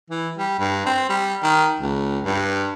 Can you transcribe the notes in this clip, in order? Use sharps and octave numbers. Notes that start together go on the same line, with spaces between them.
E3
G3
G2
C4
G3
D#3
C#2
G2